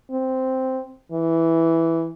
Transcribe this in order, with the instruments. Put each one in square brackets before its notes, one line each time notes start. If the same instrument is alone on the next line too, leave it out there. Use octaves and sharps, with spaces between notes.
[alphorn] C4
E3